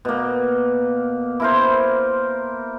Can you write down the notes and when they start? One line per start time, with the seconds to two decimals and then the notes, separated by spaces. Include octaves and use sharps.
0.05 B2 A#3
1.40 E4 A#4 C5